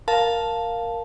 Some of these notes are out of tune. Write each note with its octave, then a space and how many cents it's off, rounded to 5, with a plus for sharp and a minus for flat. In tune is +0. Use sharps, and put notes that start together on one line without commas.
A#4 +0 F5 +5 A5 +0